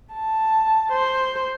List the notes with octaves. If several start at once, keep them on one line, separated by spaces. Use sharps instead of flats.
A5
C5